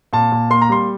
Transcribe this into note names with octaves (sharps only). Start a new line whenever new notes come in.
A#2 A5
A#2
A#3 C6
A#5
G3 C6